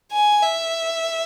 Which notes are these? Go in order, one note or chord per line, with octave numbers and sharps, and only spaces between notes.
G#5
E5